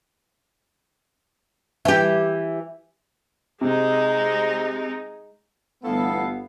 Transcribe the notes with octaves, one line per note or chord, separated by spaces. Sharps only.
E3 G4
C3 G#3 D#4
G1 A2 E3 B3 A4 F5